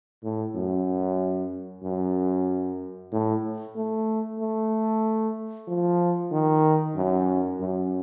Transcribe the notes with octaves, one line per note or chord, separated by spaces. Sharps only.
A2
F#2
F#2
A2
A3
A3
F3
D#3
F#2
F#2